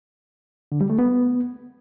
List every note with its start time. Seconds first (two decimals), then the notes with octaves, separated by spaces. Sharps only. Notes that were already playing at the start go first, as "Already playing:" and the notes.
0.72 D3
0.81 G3
0.90 A3
0.99 B3